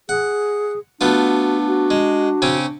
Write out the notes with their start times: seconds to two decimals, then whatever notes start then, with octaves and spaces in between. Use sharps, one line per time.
0.09 G#4 F#5
1.01 A3 B3 D4 F4 F#4
1.68 F#4
1.90 G#3
2.42 C#3 C4 C#4